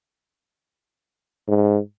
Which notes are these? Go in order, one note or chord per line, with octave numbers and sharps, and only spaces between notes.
G#2